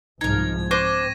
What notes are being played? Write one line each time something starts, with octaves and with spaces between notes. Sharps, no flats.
C2 G#2 F3 D#4 A#4 G#6
C4 D4 C5 C#6 D6 A#6 D#7